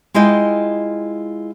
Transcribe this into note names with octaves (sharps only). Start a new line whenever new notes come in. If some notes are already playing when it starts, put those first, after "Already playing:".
G#3 E4 F4 D#5 G5